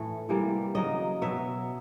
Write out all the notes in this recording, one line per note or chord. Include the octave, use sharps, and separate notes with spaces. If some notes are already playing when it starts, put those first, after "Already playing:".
Already playing: A2 E3 A3
C3 E3 G3 A#3
C#3 F#3 A#3 D#5
B2 F#3 B3 E5